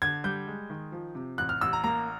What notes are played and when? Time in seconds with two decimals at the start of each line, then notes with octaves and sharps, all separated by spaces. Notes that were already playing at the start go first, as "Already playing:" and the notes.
0.02 D3 G#6
0.24 G3 G6
0.47 G#3
0.70 D#3
0.92 F3
1.15 C3
1.38 A1 F#6
1.49 F6
1.61 A1 E6
1.73 A#5
1.84 A#3 A#5